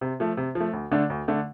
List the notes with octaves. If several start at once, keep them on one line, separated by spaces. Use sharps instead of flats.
C3
F3 A3
C3
F3
A3
D2
D3 A3 D4
D2
D3 A3 D4